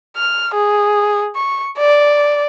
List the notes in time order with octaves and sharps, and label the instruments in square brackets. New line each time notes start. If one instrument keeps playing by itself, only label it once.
[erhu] F6
G#4
C#6
D5